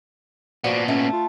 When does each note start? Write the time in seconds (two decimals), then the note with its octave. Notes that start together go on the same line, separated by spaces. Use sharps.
0.64 A#2 F3 B3 D4 F#4
0.88 A3 C#4
1.13 F4